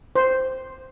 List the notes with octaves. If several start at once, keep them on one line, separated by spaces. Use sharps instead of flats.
C5